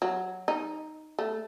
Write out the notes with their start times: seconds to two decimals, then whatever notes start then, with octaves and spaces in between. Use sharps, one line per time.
0.02 F#3
0.48 D#4
1.19 A3